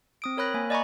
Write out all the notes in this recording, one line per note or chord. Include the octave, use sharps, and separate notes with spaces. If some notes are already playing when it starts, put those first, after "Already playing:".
C4 D#6 D7
A#4 C#5 B5 F#6 A#6
A#3 G#5
D5 D#5 G#5 A#5 B5 C#6